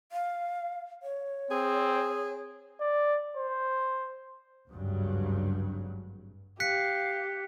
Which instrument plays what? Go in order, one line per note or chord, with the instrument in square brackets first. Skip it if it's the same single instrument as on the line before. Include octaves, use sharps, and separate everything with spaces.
[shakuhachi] F5
C#5
[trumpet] C4 [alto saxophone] G#4
[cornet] D5
C5
[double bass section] G#1 D2 G2 C#3 F#3
[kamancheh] G4 [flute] F5 [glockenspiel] F#6 B6 C#7